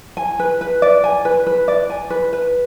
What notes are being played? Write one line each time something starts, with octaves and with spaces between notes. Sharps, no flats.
G#5
B4
B4
D5
G#5
B4
B4
D5
G#5
B4
B4